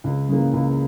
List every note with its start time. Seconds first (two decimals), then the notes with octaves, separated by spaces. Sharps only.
0.04 C#2
0.29 C#3 E3 A#3
0.54 C#2